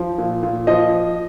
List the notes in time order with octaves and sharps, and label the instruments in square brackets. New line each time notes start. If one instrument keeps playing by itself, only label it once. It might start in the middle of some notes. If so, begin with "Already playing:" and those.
Already playing: [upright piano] F3
A#2
A#2
F3 D#5